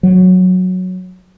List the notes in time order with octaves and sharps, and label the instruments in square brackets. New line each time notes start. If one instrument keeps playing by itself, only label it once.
[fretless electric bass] F#3